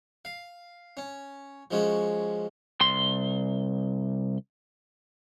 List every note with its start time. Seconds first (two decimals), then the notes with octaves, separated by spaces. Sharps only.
0.25 F5
0.97 C#4
1.71 F3 G#3 C#4 F#4
2.81 C2 C6